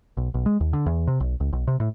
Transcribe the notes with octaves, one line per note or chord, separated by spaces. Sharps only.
B1
B1
G#3
D#2
D3
E2
C3
B1
C#2
B1
C3
A2